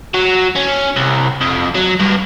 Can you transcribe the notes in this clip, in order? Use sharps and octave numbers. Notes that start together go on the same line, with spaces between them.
F#3
C#4
C2
F2
F#3
G2